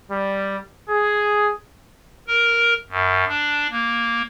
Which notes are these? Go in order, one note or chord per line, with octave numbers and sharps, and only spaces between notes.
G3
G#4
A#4
F#2
D4
A#3